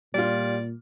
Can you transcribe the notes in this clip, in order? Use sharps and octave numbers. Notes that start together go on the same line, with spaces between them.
A#2 G3 F4 D5